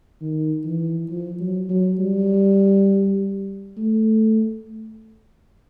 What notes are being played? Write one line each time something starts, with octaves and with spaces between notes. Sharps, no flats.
D#3
E3
F3
F#3
F#3
G3
A3